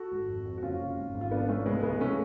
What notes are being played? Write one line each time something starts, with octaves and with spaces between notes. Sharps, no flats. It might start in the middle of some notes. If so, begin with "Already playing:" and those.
Already playing: F#4 A4
G#1
F2
F2
F#4
F#1 C#4 F4
C#3
G#1
G#1
F4
F3 B3 D4
G#2 A3 C#4
C#2 G#3 B3
C#2 G#3 B3
F3 A3 C#4